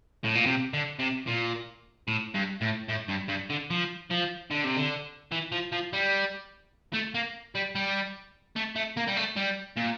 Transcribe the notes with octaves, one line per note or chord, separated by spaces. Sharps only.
A2
A#2
C3
D3
C3
A#2
A2
G2
A2
A2
G2
G2
D3
F3
F3
D3
C3
D3
E3
F3
F3
G3
A3
A#3
G3
G3
A3
A3
A#3
G3
A3
G3
A#2